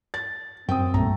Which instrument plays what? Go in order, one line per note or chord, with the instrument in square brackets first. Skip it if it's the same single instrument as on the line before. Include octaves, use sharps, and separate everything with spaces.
[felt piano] A6
[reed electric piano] F#2 [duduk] C4 [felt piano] G5 D#6
[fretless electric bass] B1 G2 A#2 [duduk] A3 [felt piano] A#5